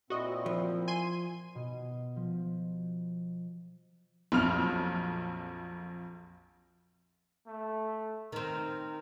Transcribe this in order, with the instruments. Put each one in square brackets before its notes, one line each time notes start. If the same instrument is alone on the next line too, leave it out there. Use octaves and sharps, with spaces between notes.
[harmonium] A#2 C4 E4 [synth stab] F#4 D#5
[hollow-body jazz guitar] F3
[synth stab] G#5 C6 D#7
[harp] B2
F3
[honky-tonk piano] A#1 F2 F#3 F6 F7
[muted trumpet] A3
[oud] D#3 C4 [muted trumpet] A#4